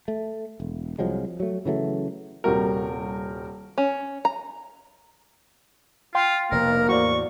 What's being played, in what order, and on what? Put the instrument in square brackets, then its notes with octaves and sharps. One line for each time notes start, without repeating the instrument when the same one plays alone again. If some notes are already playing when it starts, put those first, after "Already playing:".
[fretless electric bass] A3
E1
C2 F3 F#3 G#3
F#3 A3
C#3 E3 F#3 A3
[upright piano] D#1 C3 G3 F#4 A#4
[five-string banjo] C#4
A#5
[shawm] F4 [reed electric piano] F5 G5 C6
[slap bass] F1 B2 [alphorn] A#3 [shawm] A#4
[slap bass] E2 A2 [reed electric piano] F#4 C5 D5 [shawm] C#6